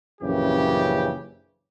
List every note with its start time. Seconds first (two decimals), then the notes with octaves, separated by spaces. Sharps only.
0.21 A#1 F#2 C#3 E3 G4